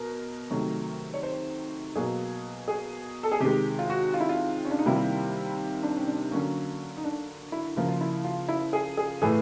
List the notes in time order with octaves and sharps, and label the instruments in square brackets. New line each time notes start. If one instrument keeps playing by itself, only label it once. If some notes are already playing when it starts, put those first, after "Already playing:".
Already playing: [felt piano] B2 A#4
C3 D#3 F#3 A3
C#5
C5
B2 F#3 A#3 G#4
G#4
A4
G#4
C3 D#3 G#3 G4
F4
F#4
F4
E4
F4
C#4
D4
D#4
C3 D#3 G3 A#3 E4
D4
C#4
D4
D3 F#3 A#3 C#4
D#4
D4
E4
C#3 F3 A#3
F4
E4
F4
E4
G#4
G#4
A2 E3 A3 G#4